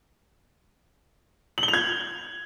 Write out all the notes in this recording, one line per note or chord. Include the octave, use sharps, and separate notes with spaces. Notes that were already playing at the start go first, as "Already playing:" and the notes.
F#7
G7
F7
G#6